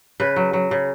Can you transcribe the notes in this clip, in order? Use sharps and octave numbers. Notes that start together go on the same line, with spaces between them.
C#3 B4
F#3
F#3
C#3